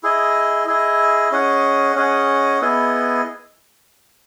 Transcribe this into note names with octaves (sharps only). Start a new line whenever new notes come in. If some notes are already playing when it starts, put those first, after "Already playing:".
E4 G#4 D#5
E4 G#4 D#5
C#4 G#4 D#5 F#5
C#4 G#4 D#5 F#5
B3 E4 G#4 D#5